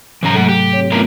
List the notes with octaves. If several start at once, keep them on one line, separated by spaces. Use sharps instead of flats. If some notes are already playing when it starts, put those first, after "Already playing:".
G#2 C3 E3 F#3 C#4 A#5
G#2 A3 A4 F#5
G4
C4 C#5
A3 B3 C#4 E4 F4 A#4